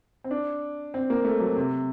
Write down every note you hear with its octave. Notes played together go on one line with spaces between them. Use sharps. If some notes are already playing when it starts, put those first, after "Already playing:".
C4
D4
C4
A#3
A3
F#3
C3